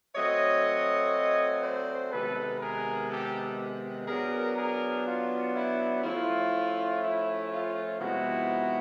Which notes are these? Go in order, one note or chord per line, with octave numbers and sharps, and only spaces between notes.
F#3 A3 C4 C#5 D#5
C5 D5
C3 D#3 G#3 B3 D#4 A4 B4
G#4 A#4
G4 A4
F#3 B3 D4 G#4 A#4
G#4 A#4
F4
E4
F3 A3 C#4 E4 F4
E4
F4
C3 F3 G#3 B3 D#4 E4 F#4